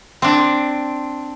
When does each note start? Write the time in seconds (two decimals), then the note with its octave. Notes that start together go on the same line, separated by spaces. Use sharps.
0.22 C4 D4